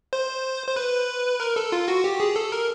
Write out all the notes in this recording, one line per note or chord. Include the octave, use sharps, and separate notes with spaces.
C5
C5
B4
A#4
A4
F4
F#4
G4
G#4
A4
A#4